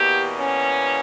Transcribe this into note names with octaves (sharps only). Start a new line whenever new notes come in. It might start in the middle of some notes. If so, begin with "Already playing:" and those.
Already playing: E2 B2 A#3 G4
C#4